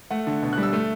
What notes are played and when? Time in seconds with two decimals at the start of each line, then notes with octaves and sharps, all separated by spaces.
0.11 A3 F#5
0.27 D3
0.42 B2
0.53 F#6
0.58 G3
0.63 E6
0.73 A3